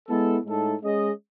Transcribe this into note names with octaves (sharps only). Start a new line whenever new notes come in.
G#3 B3 E4 A4
A2 G#3 D#4 A4
G#3 C#4 G#4 D#5